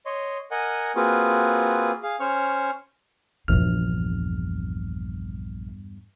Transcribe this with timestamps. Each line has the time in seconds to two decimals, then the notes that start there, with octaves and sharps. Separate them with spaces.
0.06 C#5 D#5 C6
0.51 A#4 D#5 F#5 G#5
0.96 A#3 C4 F4 F#4 G#4 B4
2.03 G#4 F5
2.20 C#4 C5 C#6 F6
3.48 A#1 E2 G2 F6